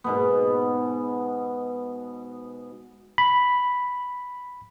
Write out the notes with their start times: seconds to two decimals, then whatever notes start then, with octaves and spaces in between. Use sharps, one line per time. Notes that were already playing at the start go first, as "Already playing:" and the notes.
0.04 G#2 B2 B3
3.18 B5